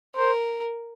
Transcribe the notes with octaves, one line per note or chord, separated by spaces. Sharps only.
A#4 C5